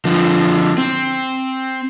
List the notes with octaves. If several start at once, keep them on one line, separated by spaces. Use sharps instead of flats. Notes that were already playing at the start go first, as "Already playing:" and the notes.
D3 F3
C4